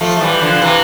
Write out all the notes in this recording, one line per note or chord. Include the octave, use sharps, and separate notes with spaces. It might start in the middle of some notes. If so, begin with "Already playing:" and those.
F3 A3
A3
E3 G3
D3 F3
D3
C3 E3